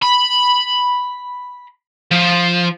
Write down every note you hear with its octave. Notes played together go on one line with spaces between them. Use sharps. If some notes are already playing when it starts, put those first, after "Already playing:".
B5
F3